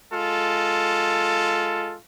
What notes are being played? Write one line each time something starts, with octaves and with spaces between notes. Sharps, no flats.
G#3 F4 A4